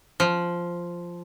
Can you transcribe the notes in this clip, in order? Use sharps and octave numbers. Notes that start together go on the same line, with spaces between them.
F3